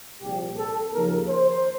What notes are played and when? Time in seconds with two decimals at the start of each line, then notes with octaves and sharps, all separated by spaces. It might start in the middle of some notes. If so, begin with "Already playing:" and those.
0.22 C2 A#2 F3 G4
0.58 A4
0.93 D#2 C#3 F3 A#4
1.29 C5